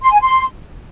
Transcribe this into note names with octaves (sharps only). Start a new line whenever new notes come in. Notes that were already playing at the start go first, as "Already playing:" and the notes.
C6
G#5
C6